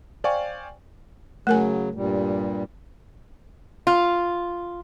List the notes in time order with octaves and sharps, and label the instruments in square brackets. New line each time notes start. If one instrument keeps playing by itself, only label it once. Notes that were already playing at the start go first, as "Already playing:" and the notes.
[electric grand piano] C5 D5 F5 G5 G#5 C#6
[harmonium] C#3 F#3 [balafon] A3 A#4 G#5
[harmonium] G2 A#2 G3
[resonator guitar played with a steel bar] F4